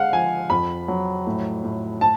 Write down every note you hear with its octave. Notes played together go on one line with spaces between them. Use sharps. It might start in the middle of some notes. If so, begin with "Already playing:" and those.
Already playing: G#3 F5 F#5
F3 G#5
F2 B5
F#3
A2
A2
A5